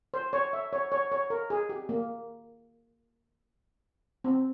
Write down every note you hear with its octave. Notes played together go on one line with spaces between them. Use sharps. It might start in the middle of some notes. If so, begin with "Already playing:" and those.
C5
C#5
E5
C#5
C#5
C#5
A#4
G#4
G4
A#3
C4